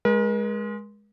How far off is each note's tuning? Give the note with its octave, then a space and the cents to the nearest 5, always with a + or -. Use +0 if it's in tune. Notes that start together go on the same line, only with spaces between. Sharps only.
G#3 +0 A#4 +45